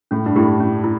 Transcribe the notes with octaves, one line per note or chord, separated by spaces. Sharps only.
A2 C#4
G2
A2 E4 G4
C#4
E4